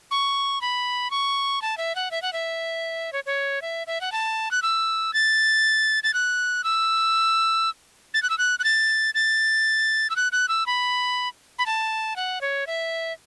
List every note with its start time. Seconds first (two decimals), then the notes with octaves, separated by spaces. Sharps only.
0.11 C#6
0.61 B5
1.11 C#6
1.62 A5
1.78 E5
1.95 F#5
2.11 E5
2.22 F#5
2.33 E5
3.13 C#5
3.26 C#5
3.62 E5
3.87 E5
4.01 F#5
4.12 A5
4.51 F#6
4.62 E6
5.14 A6
6.03 A6
6.14 F#6
6.64 E6
8.14 A6
8.23 F#6
8.30 E6
8.38 F#6
8.59 F#6
8.64 A6
9.15 A6
10.10 E6
10.16 F#6
10.32 F#6
10.49 E6
10.66 B5
11.59 B5
11.66 A5
12.16 F#5
12.41 C#5
12.67 E5